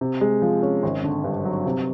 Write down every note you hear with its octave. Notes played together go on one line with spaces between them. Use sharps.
C3
G#3
F3
C#4
G#1
D3
G2
F#3
C3